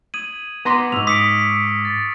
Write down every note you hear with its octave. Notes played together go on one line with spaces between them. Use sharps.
D#6 G#6 D#7 F#7
B3 A#5 C6 D6 A#6 B6
B1 G#2 C#6 E6 F6 F7
D6 D#6 B6 C#7 D7
A6